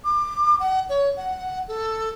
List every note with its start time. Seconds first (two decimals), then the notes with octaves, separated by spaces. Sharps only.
0.04 D6
0.60 F#5
0.89 C#5
1.17 F#5
1.68 A4